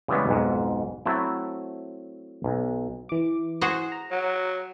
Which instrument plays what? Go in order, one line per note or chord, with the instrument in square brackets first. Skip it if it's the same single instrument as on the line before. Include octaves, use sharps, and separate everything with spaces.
[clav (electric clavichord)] C#3 E3 G3 G#3 B3
B1 F2 G#2
F#3 A3 C4 E4
B1
[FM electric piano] E3 D6
[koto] F#4 G#4 C5
[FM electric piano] A#5
[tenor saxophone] F#3